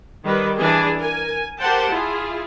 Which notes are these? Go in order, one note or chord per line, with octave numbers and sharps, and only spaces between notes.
D#3 G3 B4 D5
E3 D4 G#4
A#4 G#5
G4 A#4 C5 F#5 G5 A5
E4 F4 G#4